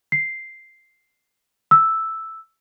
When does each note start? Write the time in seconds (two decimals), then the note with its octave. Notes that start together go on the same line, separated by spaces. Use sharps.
0.12 C7
1.71 E6